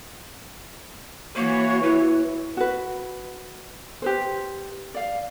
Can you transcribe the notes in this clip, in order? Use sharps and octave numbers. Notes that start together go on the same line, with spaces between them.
E3 A#3 F#4 C#5
E4 B4
F#4 B4
G4 B4 C5
D5 F5